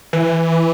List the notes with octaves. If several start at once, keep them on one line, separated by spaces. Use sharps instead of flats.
E3